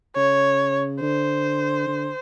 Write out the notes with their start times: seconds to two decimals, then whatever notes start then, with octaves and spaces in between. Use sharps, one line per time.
0.15 C#3 C#5
1.01 D3 C5
1.87 D3